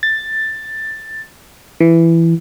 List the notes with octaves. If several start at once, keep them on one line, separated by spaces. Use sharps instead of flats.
A6
E3